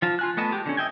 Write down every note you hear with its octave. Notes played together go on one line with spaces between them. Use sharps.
F3 F4 A5
F4 G#5 F#6
A3 B3 D#5 A5
G#3 G4
D3 B3 C#4
D#5 E5 G5 G#5